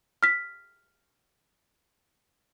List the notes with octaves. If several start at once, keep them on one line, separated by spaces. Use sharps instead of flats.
F6 B6